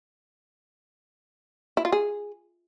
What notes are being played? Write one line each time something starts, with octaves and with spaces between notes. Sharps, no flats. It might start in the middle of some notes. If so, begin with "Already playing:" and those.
E4
F4
G#4